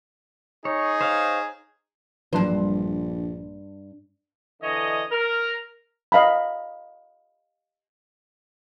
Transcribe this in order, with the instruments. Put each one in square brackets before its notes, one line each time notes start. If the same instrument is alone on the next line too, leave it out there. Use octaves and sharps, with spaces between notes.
[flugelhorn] D#4 [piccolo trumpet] G#4 [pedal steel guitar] C#5
[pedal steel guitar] C5 C#5 F5
[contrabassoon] A#1 [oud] G2 C5 [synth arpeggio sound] E3 F#3 D4
[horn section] D3 E3 C#5 D#5
A#4
[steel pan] D#5 F5 A#5 B5